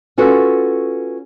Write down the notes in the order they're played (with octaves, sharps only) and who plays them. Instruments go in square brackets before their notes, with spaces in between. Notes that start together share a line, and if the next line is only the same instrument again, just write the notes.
[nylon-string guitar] C#4 F4 F#4 A4 B4